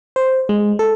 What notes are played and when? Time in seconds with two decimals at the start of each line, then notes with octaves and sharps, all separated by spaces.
0.16 C5
0.49 G#3
0.79 A4